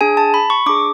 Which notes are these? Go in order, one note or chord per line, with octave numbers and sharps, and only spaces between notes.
D4 G#4 G#5
A5
B5
C#6
D4 G#4 D6